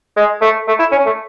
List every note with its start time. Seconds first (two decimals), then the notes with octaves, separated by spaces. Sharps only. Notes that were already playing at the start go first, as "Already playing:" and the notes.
0.17 G#3
0.41 A3
0.68 A3
0.79 E4
0.92 C#4
1.06 A3